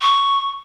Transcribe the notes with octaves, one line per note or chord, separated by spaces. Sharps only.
C#6